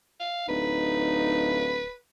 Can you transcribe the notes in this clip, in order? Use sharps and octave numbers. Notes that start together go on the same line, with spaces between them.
F5
D1 D#4 B4